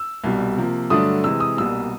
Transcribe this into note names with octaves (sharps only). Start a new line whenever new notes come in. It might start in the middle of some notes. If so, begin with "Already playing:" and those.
Already playing: E6
C2 B2 G3
C3 F3 A#3
G2 D3 F#3 A3 D4 D#6
C3 E3 G#3 E6
D#6
C2 B2 G3 A#3 E6